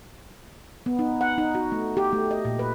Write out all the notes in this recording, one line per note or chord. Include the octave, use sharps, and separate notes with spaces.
B3
D#4
F#5
D#4
F#4
A3
G4
A3
D#5
A#2
B4